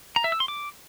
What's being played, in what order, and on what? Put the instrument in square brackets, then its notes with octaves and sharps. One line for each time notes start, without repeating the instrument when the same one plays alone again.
[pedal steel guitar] A#5
E5
E6
C6
D6